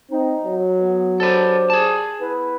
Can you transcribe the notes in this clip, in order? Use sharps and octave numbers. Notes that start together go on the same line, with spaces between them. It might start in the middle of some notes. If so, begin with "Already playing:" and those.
C4 D#4
F#3
B3
D4 G4 A4 B4 C5
G#4 A5
B3 E4 B4